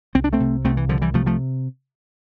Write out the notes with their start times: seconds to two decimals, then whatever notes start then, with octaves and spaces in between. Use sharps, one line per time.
0.15 C2 C4
0.24 D4
0.33 A3 C4
0.40 C3
0.65 C2 A3 C4
0.77 E3
0.89 C2 D3 F3
1.02 E3 G3
1.14 C3 F3 A3
1.26 F3 A3